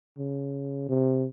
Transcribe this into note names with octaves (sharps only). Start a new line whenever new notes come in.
C#3
C3